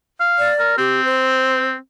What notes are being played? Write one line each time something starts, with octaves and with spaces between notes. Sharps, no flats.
F5
D5
A#4
C4 G4
C5